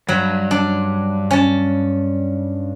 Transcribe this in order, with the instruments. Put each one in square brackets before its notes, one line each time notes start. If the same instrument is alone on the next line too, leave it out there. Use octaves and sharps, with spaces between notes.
[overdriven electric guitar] G2 [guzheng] F#3
[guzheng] D4
C#4 A5